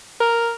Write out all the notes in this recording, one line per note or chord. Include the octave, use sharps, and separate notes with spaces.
A#4